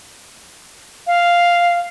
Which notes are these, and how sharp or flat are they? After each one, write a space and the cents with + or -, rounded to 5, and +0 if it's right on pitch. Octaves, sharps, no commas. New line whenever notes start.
F5 -5